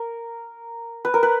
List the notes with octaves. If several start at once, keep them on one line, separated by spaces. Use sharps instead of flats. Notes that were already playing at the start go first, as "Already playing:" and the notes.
Already playing: A#4
B4
A#4
B4